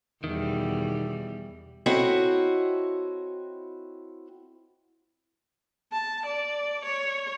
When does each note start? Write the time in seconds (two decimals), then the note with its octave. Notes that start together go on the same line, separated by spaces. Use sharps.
0.24 E2 B2 D#3 G3
1.86 C4 E4 F#4 A4 C#5 D#5
5.92 A5
6.26 D5
6.85 C#5